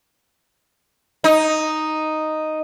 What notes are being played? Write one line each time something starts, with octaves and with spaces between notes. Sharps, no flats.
D#4